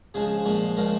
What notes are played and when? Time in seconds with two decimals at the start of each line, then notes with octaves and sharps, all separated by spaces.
0.14 C#3 F3 G#3 G#4
0.45 A#2 F3 G#3
0.77 C#3 F3 G#3 A#4